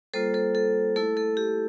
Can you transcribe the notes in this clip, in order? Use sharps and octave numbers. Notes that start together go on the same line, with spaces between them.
G3 A#3 F4 A4 C5
A4 C5
A4
A3 E4 A4
A4
G4